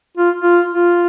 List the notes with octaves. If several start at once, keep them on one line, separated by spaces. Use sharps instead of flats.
F4
F4
F4